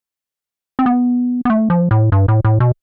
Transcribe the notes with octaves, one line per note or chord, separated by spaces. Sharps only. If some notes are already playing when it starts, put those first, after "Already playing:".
C4
B3
B3
A3
F3
A2
G2
A2
A2
B2